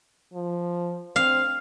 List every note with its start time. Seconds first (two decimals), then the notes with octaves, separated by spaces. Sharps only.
0.34 F3
1.16 C4 F5